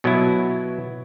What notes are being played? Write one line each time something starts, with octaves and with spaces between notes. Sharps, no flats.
B2 F#3 B3 E4